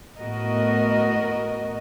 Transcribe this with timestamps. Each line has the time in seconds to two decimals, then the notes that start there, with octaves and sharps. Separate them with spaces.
0.18 A2 B3 F#4 A#4 D#5